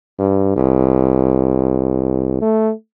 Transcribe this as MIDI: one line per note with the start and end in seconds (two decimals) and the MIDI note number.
0.19 0.54 43
0.56 2.41 36
2.41 2.72 57